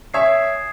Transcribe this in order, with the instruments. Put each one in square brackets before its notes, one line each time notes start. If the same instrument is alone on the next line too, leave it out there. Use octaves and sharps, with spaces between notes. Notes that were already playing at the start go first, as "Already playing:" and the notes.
[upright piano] C#5 E5 [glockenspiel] G#5 D#6 G#6 C7 E7